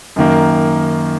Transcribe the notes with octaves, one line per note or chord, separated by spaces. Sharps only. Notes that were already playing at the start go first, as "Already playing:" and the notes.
F#2 D#3 A#3